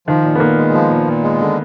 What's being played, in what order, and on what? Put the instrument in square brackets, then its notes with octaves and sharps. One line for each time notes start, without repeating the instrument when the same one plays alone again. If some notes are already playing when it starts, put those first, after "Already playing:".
[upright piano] D#3 [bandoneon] F3
[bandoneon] A#2
[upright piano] B3
[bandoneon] A#2 [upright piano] A#3
[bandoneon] G#3
F3
A#2
A#2
G#3
D3